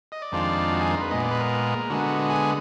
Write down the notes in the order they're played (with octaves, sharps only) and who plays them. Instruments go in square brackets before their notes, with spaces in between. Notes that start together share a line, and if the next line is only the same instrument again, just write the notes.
[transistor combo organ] D#5
D5
F2 D#3 G#3 D4 F4
F#4
G#4
A#4
B4
A#2 G#3 B3 D#5
D5
B4
A#4
D3 G#3 B3 F#4
G#4